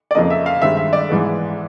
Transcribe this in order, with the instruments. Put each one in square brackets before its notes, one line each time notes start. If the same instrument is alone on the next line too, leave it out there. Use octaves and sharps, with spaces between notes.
[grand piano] D5
F2 C#3 F3 A#3 D#5
E5
F5
G2 D#3 G#3 C4 E5
E5
D5
G#2 E3 G#3 B3